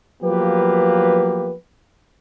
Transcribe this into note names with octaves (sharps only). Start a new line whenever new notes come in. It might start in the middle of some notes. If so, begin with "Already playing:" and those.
F3 F#3 A#3 B3 G4 B4